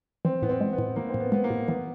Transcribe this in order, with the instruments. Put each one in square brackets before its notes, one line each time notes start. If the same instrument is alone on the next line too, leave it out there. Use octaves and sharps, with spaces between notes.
[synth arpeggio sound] E3 [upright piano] C4
[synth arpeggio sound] A2 [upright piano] B3
[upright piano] C4
[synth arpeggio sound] G#3
[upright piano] B3
[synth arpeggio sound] A2
[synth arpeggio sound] E3 [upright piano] A#3
[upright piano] C4
[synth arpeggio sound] A2
[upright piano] B3
[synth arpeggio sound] G#3 [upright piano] B3
[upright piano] A#3
[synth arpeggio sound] A2
[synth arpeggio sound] E3 [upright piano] B3